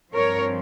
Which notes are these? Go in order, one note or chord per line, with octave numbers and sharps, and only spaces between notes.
G2 F3 C4 A#4 C#5